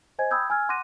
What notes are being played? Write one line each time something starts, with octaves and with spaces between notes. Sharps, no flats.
C5 D#5 G#5 G#6
G5 B5 D#6 E6 G6 G#6
G#5 E6 F6 G#6
F#5 C6 D6 F#6 A#6 D#7